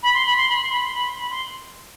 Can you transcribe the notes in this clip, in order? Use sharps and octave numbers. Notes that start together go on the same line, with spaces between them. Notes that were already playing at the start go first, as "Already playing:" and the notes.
B5
C6
B5
C6
B5
C6
B5
C6
B5
C6
B5
C6